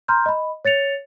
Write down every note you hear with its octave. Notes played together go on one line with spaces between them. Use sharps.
A#5 C6 F6 G6
D#5 B5
C#5 A6 C#7 F7